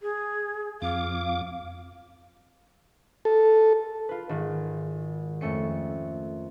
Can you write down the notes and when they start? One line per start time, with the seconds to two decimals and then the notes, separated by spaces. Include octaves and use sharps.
0.01 G#4
0.82 F2 F5 D6
3.25 A4
4.09 F4 B4
4.29 G#1 D#3 B4
5.41 F2 A3 C#4 C#7